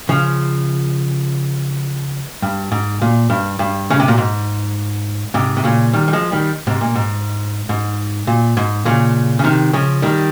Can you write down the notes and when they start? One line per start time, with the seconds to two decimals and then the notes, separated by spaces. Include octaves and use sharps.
0.09 C#3 F3
2.42 G2
2.72 G#2
3.02 A#2
3.30 G2
3.59 G2
3.90 C#3
4.00 C3
4.08 A#2
4.18 G#2
5.34 G#2 C3
5.57 C3
5.64 A#2 C#3
5.93 D#3 G3
6.08 G3
6.13 F3 G#3
6.32 D#3 G3
6.67 G#2 C3
6.81 A#2
6.95 G#2
7.69 G#2
8.27 A#2
8.57 G#2
8.85 A#2 C#3
9.39 C#3
9.44 C3 D#3
9.73 C#3 F3
10.02 D#3 G3